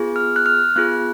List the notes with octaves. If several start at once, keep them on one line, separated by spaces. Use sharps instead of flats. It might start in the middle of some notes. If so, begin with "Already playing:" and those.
Already playing: B3 F4 G#4
F6
F#6
F6
B3 F4 G#4 F#6